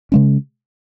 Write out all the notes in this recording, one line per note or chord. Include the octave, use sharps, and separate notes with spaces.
C#3 G#3 C#4